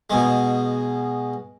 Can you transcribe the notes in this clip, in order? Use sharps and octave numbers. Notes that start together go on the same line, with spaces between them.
B2 G#3